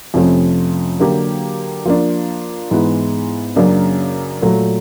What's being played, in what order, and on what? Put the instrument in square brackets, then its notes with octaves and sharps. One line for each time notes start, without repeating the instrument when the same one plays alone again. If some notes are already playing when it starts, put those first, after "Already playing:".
[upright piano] F2 C3 F3 A3 C#4
D3 F#3 A#3 D4 G4
F3 A#3 D4
G#2 E3 G#3 B3
F#2 C#3 F#3 A#3 D4
A#2 F#3 A3